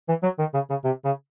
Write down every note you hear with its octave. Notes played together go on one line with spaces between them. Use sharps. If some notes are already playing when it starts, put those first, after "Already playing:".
E3
F#3
D#3
C#3
C#3
C3
C#3